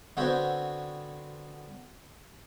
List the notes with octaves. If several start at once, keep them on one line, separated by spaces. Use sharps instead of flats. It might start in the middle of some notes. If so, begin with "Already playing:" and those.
D3 B3 C4 F#4 C5 C#5